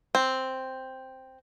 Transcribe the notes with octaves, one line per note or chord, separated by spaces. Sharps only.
C4